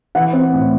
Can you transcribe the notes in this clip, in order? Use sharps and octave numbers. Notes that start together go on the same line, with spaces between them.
E3 F#5
C4
A2